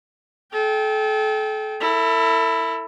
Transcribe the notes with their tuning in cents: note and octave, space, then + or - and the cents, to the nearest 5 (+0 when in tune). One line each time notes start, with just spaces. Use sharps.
A4 -35 G5 +0
E4 +0 A4 +40